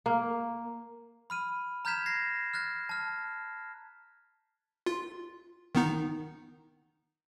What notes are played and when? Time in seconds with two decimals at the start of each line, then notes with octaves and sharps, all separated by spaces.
0.06 A#3
1.30 B5 F6 D#7
1.85 A#5 F6 G6 G#6 B6 E7
2.06 G#6 A#6 C7
2.54 F6 F#6 A6
2.89 A5 F6
4.86 F4
5.75 D#3 B3 D#4